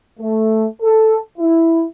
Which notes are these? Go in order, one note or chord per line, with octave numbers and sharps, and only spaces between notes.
A3
A4
E4